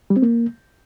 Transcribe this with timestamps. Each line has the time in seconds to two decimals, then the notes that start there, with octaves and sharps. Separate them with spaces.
0.10 G3
0.16 C4
0.22 A#3